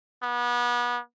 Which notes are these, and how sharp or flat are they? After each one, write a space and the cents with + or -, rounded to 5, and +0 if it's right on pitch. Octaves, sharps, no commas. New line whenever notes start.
B3 -30